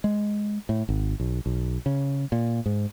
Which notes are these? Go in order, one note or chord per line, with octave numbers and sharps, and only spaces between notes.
G#3
A2
G#1
B1
B1
C#3
A#2
G#2